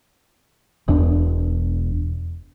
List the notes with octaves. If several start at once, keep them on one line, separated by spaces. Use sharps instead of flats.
E1 E2 D4